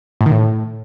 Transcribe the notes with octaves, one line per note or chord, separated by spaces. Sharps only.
A2
D#3
A2